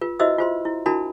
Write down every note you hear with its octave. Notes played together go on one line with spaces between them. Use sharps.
F4 B4
E4 F#4 C5 D#5 E5 E6
F4 C5 C6
E4
D4 E4 F#4 A#4 A5 B5